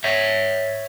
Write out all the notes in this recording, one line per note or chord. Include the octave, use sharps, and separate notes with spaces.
C#5 E5